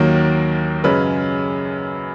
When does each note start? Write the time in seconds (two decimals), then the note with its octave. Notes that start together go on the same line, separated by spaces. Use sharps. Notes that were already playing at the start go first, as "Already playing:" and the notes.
Already playing: D#2 D#3 F#3 A#3 A#4
0.84 F#2 C#3 G#3 C#4 B4